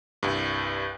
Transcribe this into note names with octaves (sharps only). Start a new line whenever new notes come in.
C2 G2